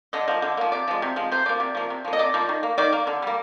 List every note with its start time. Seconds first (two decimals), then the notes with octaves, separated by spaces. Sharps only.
0.13 D3 D#5
0.28 F3 A#3
0.42 D3
0.57 F3 A#3
0.72 C3 D5
0.88 F3 G#3
1.02 C3
1.16 F3 G#3
1.32 C3 C5
1.45 F3 A#3 D5
1.60 C3
1.75 F3 A#3
1.90 C3
2.05 F3 A#3
2.13 D#5
2.19 C3 D5
2.34 F3 A#3
2.49 D#3
2.63 A#3
2.78 D#3 D5
2.92 A#3
3.07 D3
3.22 G3 A#3